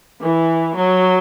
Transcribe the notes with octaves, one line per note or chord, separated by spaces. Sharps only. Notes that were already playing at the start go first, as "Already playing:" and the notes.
E3
F#3